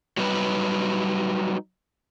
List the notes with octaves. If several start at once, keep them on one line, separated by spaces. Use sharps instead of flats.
F#3 G3 D#4 B4